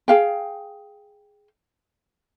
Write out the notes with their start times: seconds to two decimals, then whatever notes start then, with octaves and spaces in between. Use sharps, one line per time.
0.08 G#4 F5 G5